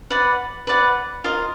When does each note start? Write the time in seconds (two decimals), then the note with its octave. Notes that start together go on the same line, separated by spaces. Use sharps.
0.10 B4 D5 F#5
0.67 B4 D5 F#5
1.24 F4 A#4 D#5